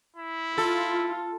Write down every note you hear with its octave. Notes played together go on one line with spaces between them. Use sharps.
E4
F4 A4